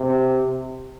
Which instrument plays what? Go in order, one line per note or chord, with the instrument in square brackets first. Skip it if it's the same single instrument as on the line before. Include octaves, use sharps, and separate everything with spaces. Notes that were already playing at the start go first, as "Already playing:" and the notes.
Already playing: [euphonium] C3